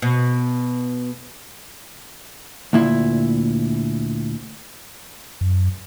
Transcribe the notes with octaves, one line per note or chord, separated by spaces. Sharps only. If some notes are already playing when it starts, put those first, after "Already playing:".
B2
D2 A#2 E4
F#2